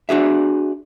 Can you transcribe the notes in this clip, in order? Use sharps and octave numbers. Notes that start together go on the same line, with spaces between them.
D4 F#4 G#4 E5